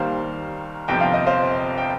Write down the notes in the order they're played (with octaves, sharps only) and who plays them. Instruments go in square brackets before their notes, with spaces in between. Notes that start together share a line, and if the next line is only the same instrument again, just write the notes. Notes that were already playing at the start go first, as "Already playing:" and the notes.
Already playing: [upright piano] D#2 D#3 G3 A#3 C5 F5
G1 F2 C3 F3 C4 G5
F5
D#5
C5 F5
G5